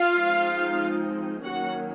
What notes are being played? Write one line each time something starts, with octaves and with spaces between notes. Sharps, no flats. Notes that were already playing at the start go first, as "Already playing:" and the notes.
Already playing: F4 F5
F3 G#3 C4 D#4
D#3 F#3 A#3 C#4 F#4 F#5